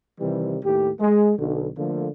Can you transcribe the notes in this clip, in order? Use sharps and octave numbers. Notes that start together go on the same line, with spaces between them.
C3 D#3 E3 G3
D#2 A2 G4
G#3
B1 D3
D3 F3 A3 A#3